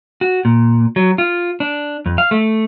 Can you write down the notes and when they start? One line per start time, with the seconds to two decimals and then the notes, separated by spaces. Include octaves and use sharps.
0.21 F#4
0.45 A#2
0.96 F#3
1.18 F4
1.60 D4
2.06 F2
2.18 F5
2.31 A3